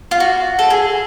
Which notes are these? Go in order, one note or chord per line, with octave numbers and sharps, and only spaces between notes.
F4
F#4
A4
G#4